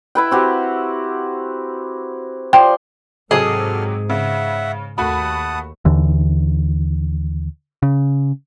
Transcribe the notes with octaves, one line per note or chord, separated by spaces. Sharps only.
E4 B4 G5
C4 F#4 G4
F3 C5 D5 G5
G#2 C3 F#3 C4 G#4 A4 D#5 F6
C#3 E5 F#5
D#2 A3 F#4 F#5 A5 B5 D#6
D#2 D3 E3
C#3